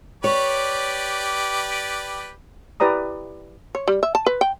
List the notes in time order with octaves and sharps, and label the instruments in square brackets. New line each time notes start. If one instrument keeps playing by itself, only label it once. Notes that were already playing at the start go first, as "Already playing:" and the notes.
[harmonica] G4 B4 D5 [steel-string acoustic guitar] C#5
[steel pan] E4 G4 B4 D5 A#5 D#6
[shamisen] C#5
G3
E5
A5
B4
G5